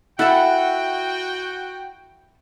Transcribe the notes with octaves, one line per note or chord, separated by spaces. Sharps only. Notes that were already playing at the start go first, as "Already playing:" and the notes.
E4 F#4 A4 E5 F#5 G5